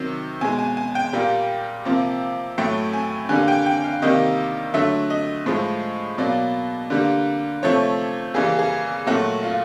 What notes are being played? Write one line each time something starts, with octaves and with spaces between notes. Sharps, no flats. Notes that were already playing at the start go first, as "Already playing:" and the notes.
Already playing: C3 D#3 F#3
B2 G#3 G#5
G#5
G#5
G5
A#2 G3 A#3
C3 F3 A#3
A2 F#3 A3 G5
G#5
D3 G3 A#3 G#5
G5
G5
F5
C3 D#3 G3 A#3 D#5
D3 F#3 A3 E5
D#5
A2 F3 G#3
B2 F#3 A#3 D5
D3 G3 A#3
C3 F3 A3 C#5
C#3 E3 G3 A#3 G#4
G#4
A#2 F#3 A3 F#4
F4